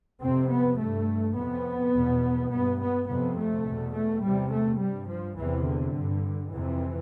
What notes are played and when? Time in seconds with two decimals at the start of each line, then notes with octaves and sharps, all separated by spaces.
0.21 F2 C3 C4
0.50 B3
0.79 G2 A3
1.36 F2 C3 B3
1.94 E2 B2
2.51 G2 B3
2.80 B3
3.08 F2 C3 B3
3.37 A3
3.66 E2 B2
3.94 A3
4.23 E2 C3 G3
4.51 A3
4.80 G2 G3
5.09 F3
5.37 E2 C3 E3
5.66 D3
5.95 G2
6.52 F2 C3 E3